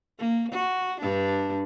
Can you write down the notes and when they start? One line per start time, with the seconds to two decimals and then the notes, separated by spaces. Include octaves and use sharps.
0.19 A#3
0.52 F#4
1.01 G2 D4